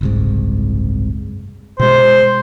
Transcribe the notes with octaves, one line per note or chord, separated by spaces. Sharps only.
F#1 C2 G#2
B2 G#3 C5